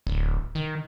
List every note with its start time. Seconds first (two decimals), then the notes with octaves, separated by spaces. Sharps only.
0.07 D1
0.55 D#3